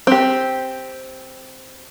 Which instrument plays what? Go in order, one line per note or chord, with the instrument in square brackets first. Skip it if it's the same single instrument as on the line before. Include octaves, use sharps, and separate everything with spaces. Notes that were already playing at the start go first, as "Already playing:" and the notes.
[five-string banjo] C4 G4